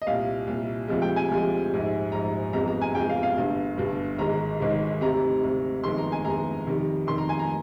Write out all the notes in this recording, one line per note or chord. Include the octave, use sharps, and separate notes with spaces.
D#5
C2 A#2 G3 F5
C2 A#2 G3
D2 C3 F3 G#3
G5
G#5
D2 C3 F3 G#3
A#1 G#2 G3
A#1 G#2 G3 A#5
G1 F2 C3 F3 G#3 A#5
A#5
G#5
G1 F2 C3 F3 G#3 G5
F5
F5
G1 G2 D3
G1 G2 D3
G#1 G#2 D#3 G#3 A#5
G#1 G#2 D#3 G#3
D2 C3 G3 A#5
D2 C3 G3
G1 F2 D#3 G#3 C6
A#5
G#5
G1 F2 D#3 G#3 A#5
F2 D#3 G3
F2 D#3 G3 C6
A#5
G#5
A#5